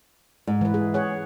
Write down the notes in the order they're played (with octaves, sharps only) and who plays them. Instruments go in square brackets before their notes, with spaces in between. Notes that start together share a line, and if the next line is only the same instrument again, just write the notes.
[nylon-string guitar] G#2
[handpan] E3 B4
G#4
G#4 C#5 F#5